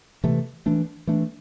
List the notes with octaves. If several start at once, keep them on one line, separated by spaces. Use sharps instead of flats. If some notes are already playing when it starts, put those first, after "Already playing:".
C3 E3 A3
E3 A3 D4
E3 A3 D4